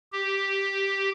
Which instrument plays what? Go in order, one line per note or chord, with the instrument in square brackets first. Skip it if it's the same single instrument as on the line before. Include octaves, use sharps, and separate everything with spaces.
[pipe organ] G4